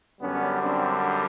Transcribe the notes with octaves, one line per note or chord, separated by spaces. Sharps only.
F#2 D3 G3 B3 C#4
C4 D4